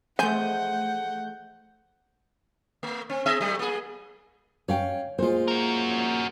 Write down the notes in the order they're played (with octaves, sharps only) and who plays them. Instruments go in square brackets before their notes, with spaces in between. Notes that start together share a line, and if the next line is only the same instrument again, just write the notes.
[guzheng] E3 F3 G#3 [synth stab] A3 G6 [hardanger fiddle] F#5 [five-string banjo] G#5
[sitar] A3
C4
B3 G#4 E5
F#3 G3 A3
A#3 G#4
[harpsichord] C#4 [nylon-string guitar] C#5 F5 G5
[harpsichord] A#2 G#3 [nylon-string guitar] F4 C5
[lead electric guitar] F#4 A#4